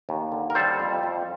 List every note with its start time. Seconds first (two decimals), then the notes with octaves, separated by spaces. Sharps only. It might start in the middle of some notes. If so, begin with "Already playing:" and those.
0.09 D#2
0.32 D3
0.50 A#4
0.55 G3 A4 C5
0.80 F2
1.03 F2